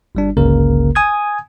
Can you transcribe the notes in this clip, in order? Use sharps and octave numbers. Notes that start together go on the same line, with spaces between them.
G1 G3 D4
G1 C#2 C#3 A#3 A#4
G#5 D#6 G#6